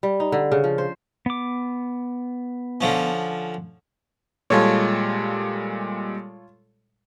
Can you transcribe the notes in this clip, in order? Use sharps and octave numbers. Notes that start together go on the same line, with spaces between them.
G3
D#4
D3
C#3
F3
C5
B3 D6
D3 F3 C#4
A#2 G3 G#3 F4 A4 C#5